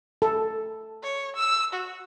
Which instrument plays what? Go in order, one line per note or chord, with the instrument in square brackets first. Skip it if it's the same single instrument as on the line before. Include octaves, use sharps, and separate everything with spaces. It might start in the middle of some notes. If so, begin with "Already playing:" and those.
[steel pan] A4
[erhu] C#5
E6
F#4